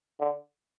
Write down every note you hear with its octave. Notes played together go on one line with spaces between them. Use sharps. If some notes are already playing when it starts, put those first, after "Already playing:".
D3